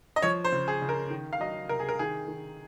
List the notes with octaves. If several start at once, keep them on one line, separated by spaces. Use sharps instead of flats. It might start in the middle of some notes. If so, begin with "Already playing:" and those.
D#5
F3 C#5
C5
C#3
G#4
C#3
A#4
D#3
F5
F#3 D#5
C3 A#4
G#4
A#4
D#3 G#4
D#3